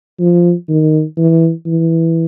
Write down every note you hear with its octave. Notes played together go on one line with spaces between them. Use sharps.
F3
D#3
E3
E3